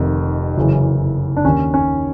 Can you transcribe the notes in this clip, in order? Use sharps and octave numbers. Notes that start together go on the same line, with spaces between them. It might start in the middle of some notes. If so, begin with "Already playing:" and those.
Already playing: F1 F2 C3 D#3
F#1 F#2 C#3 E3
D4
D#2 D#3 C#4
C#4